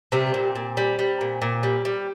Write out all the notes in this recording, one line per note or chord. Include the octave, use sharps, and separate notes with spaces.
C3 G3 C4
A#2
A#2
G3
G3
A#2
A#2
G3
G3